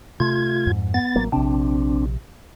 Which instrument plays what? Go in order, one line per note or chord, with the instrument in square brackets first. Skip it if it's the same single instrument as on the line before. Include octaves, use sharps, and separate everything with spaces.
[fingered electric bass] C3 A3 [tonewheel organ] F4 G#6
[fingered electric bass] F2 G#2
[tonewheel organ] B3 A6
[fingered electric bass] A1 F#3 A#3
[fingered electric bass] A#1 C3 [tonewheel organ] C4 D4